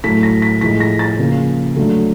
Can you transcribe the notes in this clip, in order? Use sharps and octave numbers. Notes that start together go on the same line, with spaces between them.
A2 F#3 A3 B6
A#6
B6
A2 F3 G#3 B6
A#6
A6
C#3 F3 A#3
D3 F#3 A3